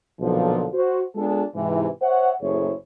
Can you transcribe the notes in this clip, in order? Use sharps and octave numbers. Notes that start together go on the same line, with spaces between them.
B1 A#2 D3 F3
F#4 C5
G#3 B3 D4 F4 G#4 A4
G#2 C3 E3
C5 C#5 E5 F#5
F#1 A2 E4 G#4 C5 C#5